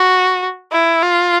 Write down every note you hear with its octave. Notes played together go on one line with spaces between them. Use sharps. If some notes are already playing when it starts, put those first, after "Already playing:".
Already playing: F#4
E4
F4